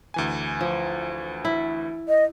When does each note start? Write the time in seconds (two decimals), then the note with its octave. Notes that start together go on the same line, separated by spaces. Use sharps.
0.14 D2 E3 G#5
0.61 F3
1.45 E4
2.09 D#5